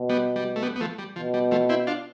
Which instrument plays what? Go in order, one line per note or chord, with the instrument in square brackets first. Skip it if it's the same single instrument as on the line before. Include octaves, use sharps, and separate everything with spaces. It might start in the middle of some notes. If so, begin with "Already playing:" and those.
Already playing: [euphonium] B2
[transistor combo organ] G3 B3
G3
A3
G3 B3
B3
F3 A3
G3
[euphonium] B2 [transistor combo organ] F3
[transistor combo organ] G3
F3 A3
C4 E4
D4 F4